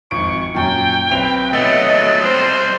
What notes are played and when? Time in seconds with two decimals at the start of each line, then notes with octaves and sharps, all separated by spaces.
0.11 G#1 F2 C#6 D7
0.55 F#2 A#2 G5
1.11 B1 C4 B4 F7
1.53 F#3 A3 B3 D#5 A6
2.22 G3 C4 C5